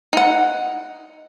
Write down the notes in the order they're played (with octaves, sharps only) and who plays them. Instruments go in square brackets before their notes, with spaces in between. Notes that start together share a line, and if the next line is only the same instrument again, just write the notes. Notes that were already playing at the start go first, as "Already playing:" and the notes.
[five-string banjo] D#4 F#5